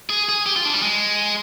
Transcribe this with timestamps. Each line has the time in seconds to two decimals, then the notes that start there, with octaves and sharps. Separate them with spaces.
0.10 G#4
0.29 G#4
0.46 G4
0.56 F4
0.65 D4
0.74 G3
0.82 G#3